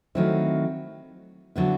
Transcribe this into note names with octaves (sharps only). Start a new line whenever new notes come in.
D#3 F#3 A3 C4 E4
D3 F#3 B3 E4